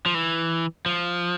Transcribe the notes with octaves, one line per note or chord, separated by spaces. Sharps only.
F3
E3
F3